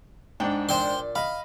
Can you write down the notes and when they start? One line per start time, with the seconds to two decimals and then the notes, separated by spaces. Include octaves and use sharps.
0.40 G#2 D4 F#5 G5
0.69 A#2 C5 D5 G5 C6
1.16 D#5 F5 B5